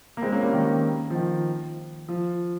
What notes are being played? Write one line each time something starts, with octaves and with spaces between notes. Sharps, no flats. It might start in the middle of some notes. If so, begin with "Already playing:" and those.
A#3
G#3 C4
A#3 C#4
G3 A#3
D#3 G3
F3
D#3
F3